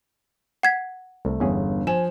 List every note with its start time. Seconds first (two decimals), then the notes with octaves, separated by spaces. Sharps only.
0.63 F#5 G#6 B6
1.25 C2 A3
1.40 G1 E2 G2 C#4 G#4
1.87 F3 G#5 E7